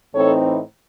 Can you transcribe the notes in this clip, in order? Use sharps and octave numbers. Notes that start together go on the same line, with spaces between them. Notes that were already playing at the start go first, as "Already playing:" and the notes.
A2 E3 C4 D#4 A4 C#5